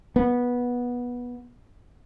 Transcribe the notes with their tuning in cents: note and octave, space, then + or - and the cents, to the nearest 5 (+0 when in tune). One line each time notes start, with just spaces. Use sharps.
B3 -15